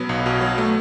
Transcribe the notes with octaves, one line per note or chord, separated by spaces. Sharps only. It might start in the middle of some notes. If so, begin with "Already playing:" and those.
Already playing: B2 F#3 B3
B1
B2
F#3
A3